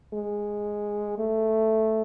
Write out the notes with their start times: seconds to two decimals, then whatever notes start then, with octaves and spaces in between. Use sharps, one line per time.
0.13 G#3
1.18 A3